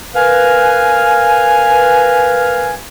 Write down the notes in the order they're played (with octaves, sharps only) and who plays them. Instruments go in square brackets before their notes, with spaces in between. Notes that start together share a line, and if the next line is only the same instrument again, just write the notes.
[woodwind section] A#4 B4 F5 G#5